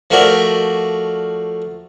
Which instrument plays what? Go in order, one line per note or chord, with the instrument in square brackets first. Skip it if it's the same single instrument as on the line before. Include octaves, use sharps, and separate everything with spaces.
[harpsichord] F3 A3 F#4 A#4 D5